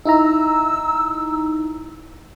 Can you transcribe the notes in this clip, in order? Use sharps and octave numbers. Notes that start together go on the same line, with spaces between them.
D#4 E4 A#5 E6